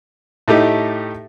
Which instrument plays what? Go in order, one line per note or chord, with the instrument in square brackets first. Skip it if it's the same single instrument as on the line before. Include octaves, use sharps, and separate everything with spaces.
[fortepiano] A2 A3 D#4 G4